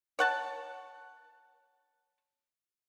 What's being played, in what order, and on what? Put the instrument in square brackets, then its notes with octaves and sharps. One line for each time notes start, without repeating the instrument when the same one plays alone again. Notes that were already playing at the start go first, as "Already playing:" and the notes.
[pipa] C#5 F#5 A5